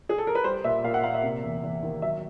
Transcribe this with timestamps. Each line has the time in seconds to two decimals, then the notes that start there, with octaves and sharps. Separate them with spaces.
0.09 G#4
0.18 A4
0.27 A#4
0.35 B4
0.44 G3 C5
0.64 A#2 E5
0.84 A#2 F5
0.94 F#5
1.03 A#3 F5
1.14 E5
1.23 C3
1.43 E2
1.63 E2
1.83 D#3
2.02 F#3 E5